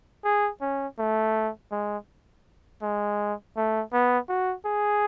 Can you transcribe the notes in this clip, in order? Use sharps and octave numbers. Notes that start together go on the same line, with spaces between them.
G#4
C#4
A3
G#3
G#3
A3
B3
F#4
G#4